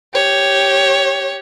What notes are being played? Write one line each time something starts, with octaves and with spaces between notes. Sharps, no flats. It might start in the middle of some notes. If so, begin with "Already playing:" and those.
G4 C#5